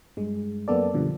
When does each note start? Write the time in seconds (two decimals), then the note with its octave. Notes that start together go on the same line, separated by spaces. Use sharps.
0.17 G2 G#3
0.68 F#2 A#3 B3 A4 D5
0.94 B2 D3 F3 G3